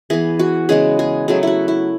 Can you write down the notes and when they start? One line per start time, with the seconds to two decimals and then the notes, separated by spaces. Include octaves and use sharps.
0.10 E3 B3 G#4
0.39 F#4
0.69 C#3 G#3 B3 G#4
0.99 G#4
1.28 C#3 F#3 A3 G#4
1.43 E4 F#4
1.68 E4